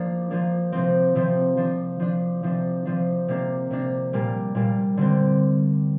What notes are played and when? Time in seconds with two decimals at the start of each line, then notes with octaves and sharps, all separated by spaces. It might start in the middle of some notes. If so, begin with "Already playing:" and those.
Already playing: F3 A#3 D4
0.31 F3 A#3 D4
0.72 C3 F3 C4
1.15 C3 F3 C4
1.57 F3 D4
2.00 F3 D4
2.43 C3 F3 D4
2.85 C3 F3 D4
3.28 C3 A#3 D4
3.71 C3 A#3 D4
4.13 A#2 G3 A#3
4.55 A#2 G3 A#3
4.97 D3 G3 C4